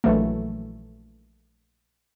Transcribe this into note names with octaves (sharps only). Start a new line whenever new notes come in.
A#1 E3 F#3 A3